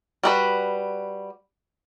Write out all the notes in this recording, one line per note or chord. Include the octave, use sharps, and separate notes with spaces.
G3 F#4 B4